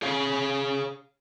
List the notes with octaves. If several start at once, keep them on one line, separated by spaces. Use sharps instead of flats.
G#4 C#5 F5